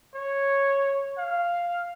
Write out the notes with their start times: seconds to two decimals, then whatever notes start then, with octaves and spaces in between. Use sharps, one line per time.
0.14 C#5
1.17 F5